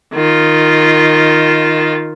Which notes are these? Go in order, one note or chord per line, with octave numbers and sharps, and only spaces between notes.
D#3 F4